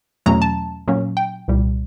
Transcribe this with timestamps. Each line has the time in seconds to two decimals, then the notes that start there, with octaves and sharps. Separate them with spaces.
0.26 E2 B2 F#3 A3 C#4 A#5
0.42 A5
0.88 A#2 F#3 A#3 C#4
1.17 G5
1.48 C2 A#2 G3